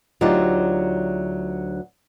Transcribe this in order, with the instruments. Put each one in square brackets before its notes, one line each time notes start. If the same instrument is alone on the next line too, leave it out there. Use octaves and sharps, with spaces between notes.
[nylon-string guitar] D2 F#3 D4 D#4 F4 G4